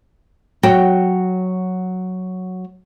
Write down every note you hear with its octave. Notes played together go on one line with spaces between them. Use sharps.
F#3 F#4 G5